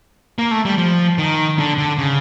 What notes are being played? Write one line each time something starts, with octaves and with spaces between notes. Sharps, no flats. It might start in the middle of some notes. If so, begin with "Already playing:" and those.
A#3
A3
G3
F3
D#3
D3
D3
C#3